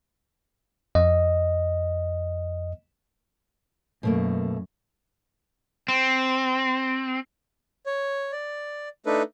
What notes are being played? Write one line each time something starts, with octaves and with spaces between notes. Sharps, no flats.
F2 D#5
F#2 B2 A3 A#3
C4
C#5
D5
A3 D4 D#4 A4 B4